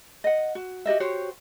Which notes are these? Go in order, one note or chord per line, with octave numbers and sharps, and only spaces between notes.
D#5 F#5
F#4
F#4 G4 D#5 E5
F#4 G4 C5 C#5